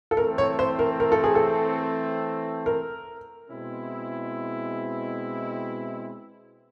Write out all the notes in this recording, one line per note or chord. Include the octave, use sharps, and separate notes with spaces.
A4
E3 A3 C4 A#4
C#5
C5
A#4
A#4
A4
G#4
A4
A#4
B2 G#3 C4 E4